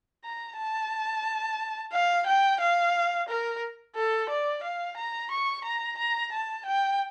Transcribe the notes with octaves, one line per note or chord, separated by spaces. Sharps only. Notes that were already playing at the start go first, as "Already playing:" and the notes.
A#5
A5
F5
G5
F5
A#4
A4
D5
F5
A#5
C#6
A#5
A#5
A5
G5